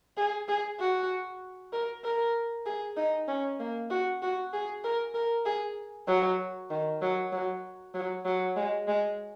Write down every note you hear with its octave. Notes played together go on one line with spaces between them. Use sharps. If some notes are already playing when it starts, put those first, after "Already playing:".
G#4
G#4
F#4
A#4
A#4
G#4
D#4
C#4
A#3
F#4
F#4
G#4
A#4
A#4
G#4
F#3
D#3
F#3
F#3
F#3
F#3
G#3
G#3